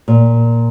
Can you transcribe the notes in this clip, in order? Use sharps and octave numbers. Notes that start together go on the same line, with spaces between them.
A#2